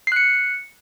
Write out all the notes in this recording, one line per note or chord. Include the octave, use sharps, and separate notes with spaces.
F#6 C7 C#7